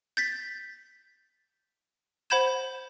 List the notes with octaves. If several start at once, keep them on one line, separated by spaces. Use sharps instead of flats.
G6 A6 B6
C5 F#5 B5 G6 G#6 E7